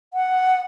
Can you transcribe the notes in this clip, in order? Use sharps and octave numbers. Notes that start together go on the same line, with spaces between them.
F#5